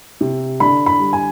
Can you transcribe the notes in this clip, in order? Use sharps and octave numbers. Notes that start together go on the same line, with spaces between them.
C3
D3 B5
B5
G3
G#5